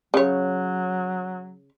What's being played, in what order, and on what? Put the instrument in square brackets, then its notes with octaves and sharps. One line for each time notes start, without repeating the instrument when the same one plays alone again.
[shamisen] C#3 C#5 [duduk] F#3